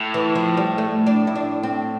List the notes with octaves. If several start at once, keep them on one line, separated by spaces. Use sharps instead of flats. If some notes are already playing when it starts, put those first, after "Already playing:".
Already playing: A2
E3
F3
G3
A3
D4
E4
D4
C4